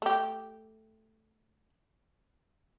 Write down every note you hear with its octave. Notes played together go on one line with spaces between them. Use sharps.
A3 G4